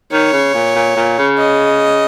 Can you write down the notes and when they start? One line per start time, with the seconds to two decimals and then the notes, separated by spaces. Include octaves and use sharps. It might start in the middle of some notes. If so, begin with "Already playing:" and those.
0.12 D#3 C#5
0.33 C#3
0.54 A#2
0.76 A#2
0.96 A#2
1.18 C#3
1.38 D#5